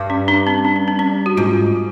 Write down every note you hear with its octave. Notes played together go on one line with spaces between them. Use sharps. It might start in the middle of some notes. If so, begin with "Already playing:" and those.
Already playing: G2
C#4
D4
C4
D4
C#4
C4
C#4
F#4
G#2 F4